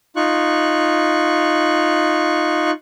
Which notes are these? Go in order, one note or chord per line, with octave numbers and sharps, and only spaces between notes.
D#4 F4 C#6 F#6